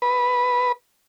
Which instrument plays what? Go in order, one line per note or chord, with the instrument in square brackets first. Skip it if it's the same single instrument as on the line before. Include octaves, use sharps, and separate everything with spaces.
[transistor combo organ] B4